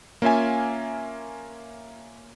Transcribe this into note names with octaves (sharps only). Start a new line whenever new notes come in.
A#3 C#4 F4 E5 G#5